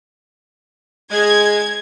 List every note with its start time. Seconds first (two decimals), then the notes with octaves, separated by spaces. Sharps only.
1.11 G#3 G#6